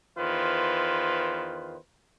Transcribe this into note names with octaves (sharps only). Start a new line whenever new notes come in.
E2 D#3 F4 B4 C5